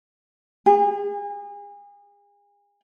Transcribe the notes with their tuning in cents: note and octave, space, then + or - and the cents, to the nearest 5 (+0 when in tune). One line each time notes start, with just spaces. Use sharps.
G#4 -35